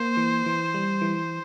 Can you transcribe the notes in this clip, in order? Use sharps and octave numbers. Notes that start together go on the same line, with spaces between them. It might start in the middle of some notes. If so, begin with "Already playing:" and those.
Already playing: A#3 C5
E3
E3
G3
E3